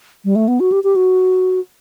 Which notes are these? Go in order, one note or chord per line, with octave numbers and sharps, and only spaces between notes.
G3
A3
B3
F#4
G4
G4
F#4